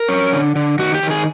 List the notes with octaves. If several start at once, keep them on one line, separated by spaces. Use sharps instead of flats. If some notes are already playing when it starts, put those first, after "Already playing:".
Already playing: A#4
C#4
D3
D3
D#3 F#4
G4
D#3
G#4